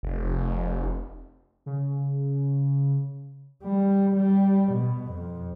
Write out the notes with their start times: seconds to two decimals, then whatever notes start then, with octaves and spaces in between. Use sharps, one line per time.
0.03 F1
1.66 C#3
3.64 G3
4.16 G3
4.73 B2
5.09 F2